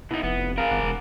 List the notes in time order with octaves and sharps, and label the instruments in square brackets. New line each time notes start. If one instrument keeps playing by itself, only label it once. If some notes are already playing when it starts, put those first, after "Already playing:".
[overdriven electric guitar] B2 D#4 [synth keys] E4
[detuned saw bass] F1 [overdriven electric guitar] B3
[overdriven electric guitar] G#4 A#4 [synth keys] F5
[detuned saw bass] G1 [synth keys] F#5 D6
[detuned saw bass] E1